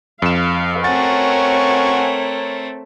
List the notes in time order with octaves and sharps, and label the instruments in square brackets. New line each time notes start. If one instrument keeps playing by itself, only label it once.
[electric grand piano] F2 E7 [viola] F5
[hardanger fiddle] A3 C4 [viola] A#4 C#5 [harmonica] F#5 G#5 C#6 [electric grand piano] A6